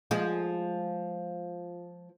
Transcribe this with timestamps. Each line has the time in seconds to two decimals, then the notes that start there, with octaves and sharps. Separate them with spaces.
0.11 F3 G#3